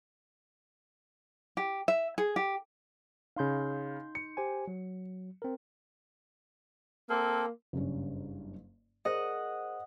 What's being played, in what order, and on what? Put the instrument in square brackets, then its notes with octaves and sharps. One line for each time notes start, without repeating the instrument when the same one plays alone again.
[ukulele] G4
E5
G#4
G4
[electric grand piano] C#3 F5 [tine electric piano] D#4 C6 G6
[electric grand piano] C#7
[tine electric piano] G4 C5 G#5
F#3
C4 A#4
[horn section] A#3 [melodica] C4 A4
[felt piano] F#1 G2 C#4
[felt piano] G#4 A#4 C5 [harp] D#5 F#5